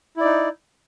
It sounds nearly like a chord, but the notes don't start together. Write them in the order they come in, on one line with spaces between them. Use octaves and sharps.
E4 D5 D#4